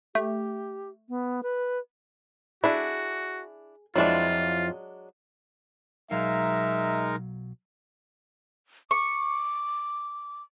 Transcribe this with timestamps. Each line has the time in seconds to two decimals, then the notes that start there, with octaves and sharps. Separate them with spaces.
0.15 A3 G4
1.09 B3
1.43 B4
2.64 D4 E4 F#4 G#4
3.96 F2 F3 F#3 G#3 D4 E4 F4
6.11 B1 F#3 G#3 D#4 A#4 E5 F5
8.91 C#6 D6